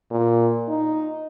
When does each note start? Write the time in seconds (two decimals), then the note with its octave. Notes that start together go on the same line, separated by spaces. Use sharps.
0.11 A#2
0.68 D#4